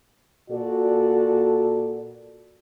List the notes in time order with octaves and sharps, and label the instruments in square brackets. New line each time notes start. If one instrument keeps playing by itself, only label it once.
[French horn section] A#2 F#4 A4 D5